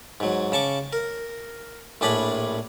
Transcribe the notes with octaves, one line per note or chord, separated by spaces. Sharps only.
G#2 F#3
C#3 A5 C#6 D6
A#4
A#1 A2 D4 G#4 D5 B5